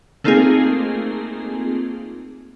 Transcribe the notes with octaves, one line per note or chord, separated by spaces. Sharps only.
A3 A#3 C4 D#4 F4 G#4